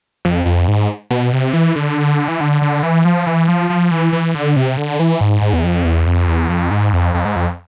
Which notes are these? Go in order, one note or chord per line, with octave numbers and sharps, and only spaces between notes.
F2
F2
G#2
B2
C3
E3
D3
E3
D3
D3
E3
F3
E3
F3
F3
E3
E3
D3
C3
D3
E3
G#2
G#2
E2
F2
E2
F2
E2
F2
G#2
F2
F2
G#2
F2